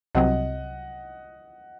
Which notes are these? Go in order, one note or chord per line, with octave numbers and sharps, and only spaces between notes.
C2 C3 F#3 C4 D#5 F#5